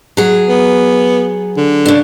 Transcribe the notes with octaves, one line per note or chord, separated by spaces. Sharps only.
F#3 G#4
B3
D3
C#3 D4